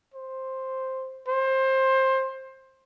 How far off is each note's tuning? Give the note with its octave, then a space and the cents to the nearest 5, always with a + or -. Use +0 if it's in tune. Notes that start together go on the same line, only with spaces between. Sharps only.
C5 +5
C5 +20